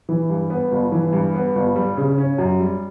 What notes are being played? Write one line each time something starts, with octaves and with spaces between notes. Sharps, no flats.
E3
G2
B3
G1
E3
G2
B3
G1
G3
C#3
C#4
F#2
G3